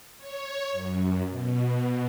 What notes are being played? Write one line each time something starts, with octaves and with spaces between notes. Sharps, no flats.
C#5
F#2
B2